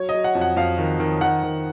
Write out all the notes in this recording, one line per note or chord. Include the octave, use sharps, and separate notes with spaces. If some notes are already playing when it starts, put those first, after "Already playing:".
Already playing: F#3 C#5
D#5
F#3
F#5
F2
F#5
F2 F5
D#3
D#3
D#3 F#5
D#3